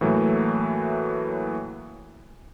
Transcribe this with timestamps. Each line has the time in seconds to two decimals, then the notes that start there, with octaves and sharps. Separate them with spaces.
0.01 A2 E3 F#3 A3 A#3